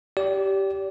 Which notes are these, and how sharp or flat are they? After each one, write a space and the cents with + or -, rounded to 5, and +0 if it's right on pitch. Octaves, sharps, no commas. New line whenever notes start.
G4 -10 D5 -35